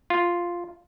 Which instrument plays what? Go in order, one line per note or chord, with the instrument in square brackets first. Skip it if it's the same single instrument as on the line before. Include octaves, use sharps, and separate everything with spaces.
[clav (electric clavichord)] F4